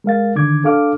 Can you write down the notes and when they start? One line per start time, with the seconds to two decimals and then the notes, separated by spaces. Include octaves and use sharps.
0.04 G#3 A#4 F5 A6
0.36 D3 D#3 D6 G#6
0.64 D4 A4 F5 D6 F6